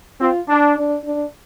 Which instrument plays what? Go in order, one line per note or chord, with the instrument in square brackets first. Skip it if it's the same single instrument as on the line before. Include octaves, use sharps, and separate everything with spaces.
[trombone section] C4 [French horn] F4
[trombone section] D4
[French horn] D4
D4